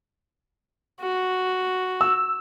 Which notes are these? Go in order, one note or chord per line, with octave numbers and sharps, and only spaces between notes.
F#4
E6